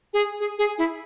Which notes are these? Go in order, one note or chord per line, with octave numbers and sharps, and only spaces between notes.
G#4
G#4
G#4
E4